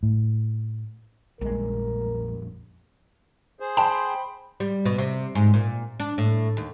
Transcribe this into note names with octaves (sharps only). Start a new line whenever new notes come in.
A2
A#1 F2 A#2 G3 G#3 A#4
G#4 C5
G5 A5 B5 C6
G3
B2
C3
G#2
A#2
D4
A2
D#2